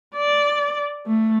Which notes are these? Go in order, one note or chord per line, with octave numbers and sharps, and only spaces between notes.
D5
A3